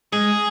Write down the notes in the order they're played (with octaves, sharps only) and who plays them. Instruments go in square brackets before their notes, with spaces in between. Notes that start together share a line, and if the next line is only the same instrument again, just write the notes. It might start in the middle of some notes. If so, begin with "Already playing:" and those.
[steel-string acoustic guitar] G#3 [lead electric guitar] G#4